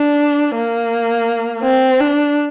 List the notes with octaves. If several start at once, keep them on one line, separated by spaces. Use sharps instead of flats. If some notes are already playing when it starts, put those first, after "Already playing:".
Already playing: D4
A#3
C4
D4